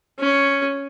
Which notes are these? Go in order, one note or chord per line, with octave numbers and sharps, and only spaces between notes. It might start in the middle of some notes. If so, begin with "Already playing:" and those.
C#4